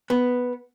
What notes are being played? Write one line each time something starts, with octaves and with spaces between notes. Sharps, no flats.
B3